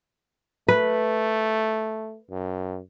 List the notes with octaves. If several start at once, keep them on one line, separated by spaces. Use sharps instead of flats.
A3 B4
F#2